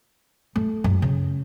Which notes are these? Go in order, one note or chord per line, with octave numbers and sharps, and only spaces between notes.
A3
F#2
C#3